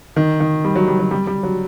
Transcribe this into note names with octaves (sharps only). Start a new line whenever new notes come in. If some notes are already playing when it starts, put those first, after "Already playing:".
D#3
D#3
G3
F#3
G3
F#3
G3
G3
F#3